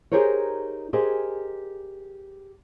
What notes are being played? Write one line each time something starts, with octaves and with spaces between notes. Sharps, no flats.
D#4 G4 G#4 A#4 C5 C#5
G4 G#4 A#4 C5 D#5 G#5